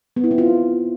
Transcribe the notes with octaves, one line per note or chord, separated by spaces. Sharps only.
B3
E4
C4
F4